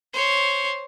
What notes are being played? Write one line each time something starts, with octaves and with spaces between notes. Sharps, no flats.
C5 C#5